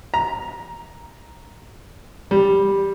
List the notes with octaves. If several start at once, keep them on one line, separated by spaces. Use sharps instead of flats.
A#5
G3